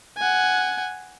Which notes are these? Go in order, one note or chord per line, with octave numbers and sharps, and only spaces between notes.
F#5 G#5